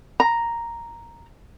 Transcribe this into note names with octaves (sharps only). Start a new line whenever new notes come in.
A#5